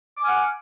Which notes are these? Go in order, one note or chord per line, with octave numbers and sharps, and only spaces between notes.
F#5 G#5 D6 F6